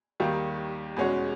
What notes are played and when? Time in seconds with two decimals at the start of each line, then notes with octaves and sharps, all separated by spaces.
0.20 D#2 D#3 G3 A#3
0.96 E2 B2 G#3 C#4 F#4